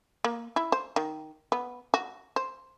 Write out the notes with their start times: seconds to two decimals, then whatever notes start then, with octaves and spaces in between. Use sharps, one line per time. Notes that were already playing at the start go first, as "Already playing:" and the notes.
0.24 A#3
0.56 E4
0.72 C5
0.96 D#3
1.52 B3
1.94 F#4
2.36 C5